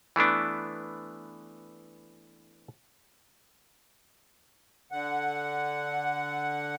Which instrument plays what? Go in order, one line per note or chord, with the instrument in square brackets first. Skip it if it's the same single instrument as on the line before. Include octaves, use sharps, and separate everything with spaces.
[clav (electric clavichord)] E3 A3 B3 D4
[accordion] D3 F#5